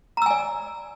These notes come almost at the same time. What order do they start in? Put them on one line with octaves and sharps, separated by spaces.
A#5 E6 G#5 D5